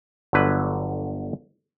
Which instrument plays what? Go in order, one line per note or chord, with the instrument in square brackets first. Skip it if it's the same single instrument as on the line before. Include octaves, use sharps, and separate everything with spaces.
[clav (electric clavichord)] G1 D3 F#3 B4